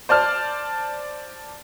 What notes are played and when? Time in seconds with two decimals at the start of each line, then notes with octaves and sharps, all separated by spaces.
0.09 C5 D5 A5 F6